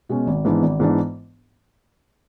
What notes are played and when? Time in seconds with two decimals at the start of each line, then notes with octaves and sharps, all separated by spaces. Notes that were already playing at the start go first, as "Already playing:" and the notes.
0.09 B2 G#3 C#4
0.27 G#1
0.45 G#2 E3 B3 D4
0.62 G#1
0.80 G#2 E3 B3 D4